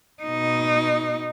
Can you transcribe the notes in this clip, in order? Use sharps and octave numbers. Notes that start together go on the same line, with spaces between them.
B2 D#4